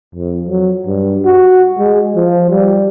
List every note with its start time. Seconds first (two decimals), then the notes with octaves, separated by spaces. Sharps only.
0.15 F2
0.48 F#3
0.87 G2
1.25 F#4
1.79 G#3
2.16 F3
2.50 G3